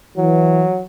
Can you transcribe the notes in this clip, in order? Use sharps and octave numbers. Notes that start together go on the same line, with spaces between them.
E3 F#3